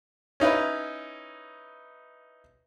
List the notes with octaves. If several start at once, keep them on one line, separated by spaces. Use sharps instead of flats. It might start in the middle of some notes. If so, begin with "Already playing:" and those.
C#4 D#4 E4 B4